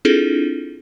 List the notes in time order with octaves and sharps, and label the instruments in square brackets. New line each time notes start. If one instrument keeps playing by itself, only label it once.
[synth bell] C4 D4 E4 F4 G#4 A4